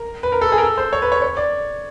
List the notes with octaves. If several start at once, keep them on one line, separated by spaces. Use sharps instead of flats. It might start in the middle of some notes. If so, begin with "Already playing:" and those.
Already playing: A#4
B4
A#4
A4
G#4
A#4
A4
C5
C#5
B4
C#5
C#5
D5